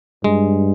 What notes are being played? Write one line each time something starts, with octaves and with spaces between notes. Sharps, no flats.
G2 G#3